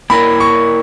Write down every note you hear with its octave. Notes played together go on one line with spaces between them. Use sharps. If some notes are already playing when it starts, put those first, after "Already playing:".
A#3 E4 A#4 B5
C#6